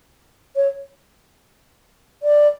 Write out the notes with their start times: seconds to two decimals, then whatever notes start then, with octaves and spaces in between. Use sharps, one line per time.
0.56 C#5
2.23 D5